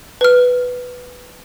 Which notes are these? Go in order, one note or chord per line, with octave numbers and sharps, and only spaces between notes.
B4 F6